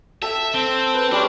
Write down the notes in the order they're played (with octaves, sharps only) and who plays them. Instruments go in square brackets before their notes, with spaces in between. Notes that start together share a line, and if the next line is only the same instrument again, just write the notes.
[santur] A4 G5 [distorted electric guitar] E5
[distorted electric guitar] C4
[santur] B4
[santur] G3 G#3 C#4 [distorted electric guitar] D4